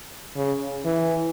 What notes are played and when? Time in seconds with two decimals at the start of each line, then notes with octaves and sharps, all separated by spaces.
0.37 C#3
0.86 E3